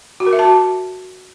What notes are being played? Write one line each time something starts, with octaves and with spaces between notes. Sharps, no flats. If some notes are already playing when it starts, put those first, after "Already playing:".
F#4
A#4
E5
A5
F#4